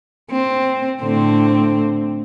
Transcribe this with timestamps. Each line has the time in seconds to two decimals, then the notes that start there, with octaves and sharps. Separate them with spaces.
0.31 C4
1.02 A2 D3 C4